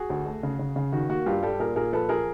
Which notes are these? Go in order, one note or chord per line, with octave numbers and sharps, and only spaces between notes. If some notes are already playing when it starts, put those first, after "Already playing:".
Already playing: F#4 G#4
D2
A3
C#3
C#3
C#3
D#3 F#4
A#3 F#4
G2 F4 G4
G3 G4 A4
A#2 G#4 A#4
A#2 G#4 A#4
F3 A4 B4
F3 G#4 A#4